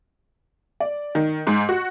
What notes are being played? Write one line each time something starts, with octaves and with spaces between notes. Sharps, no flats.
D5
D#3
G#2
F#4